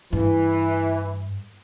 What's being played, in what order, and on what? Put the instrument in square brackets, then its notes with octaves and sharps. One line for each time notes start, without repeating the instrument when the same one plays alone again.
[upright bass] G2 [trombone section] E3